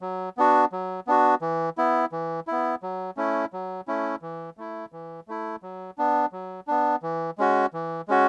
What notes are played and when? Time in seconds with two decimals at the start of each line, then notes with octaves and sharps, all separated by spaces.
0.01 F#3
0.37 B3 D4 F#4
0.72 F#3
1.07 B3 D4 F#4
1.41 E3
1.78 B3 E4
2.12 E3
2.47 B3 E4
2.83 F#3
3.17 A3 C#4 E4
3.53 F#3
3.88 A3 C#4 E4
4.22 E3
4.57 A3 E4
4.92 E3
5.28 A3 E4
5.63 F#3
5.98 B3 D4
6.32 F#3
6.67 B3 D4
7.03 E3
7.38 G#3 C#4 F#4
7.73 E3
8.08 G#3 C#4 F#4